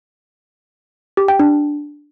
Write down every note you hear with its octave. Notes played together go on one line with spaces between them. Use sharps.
G4
G5
D4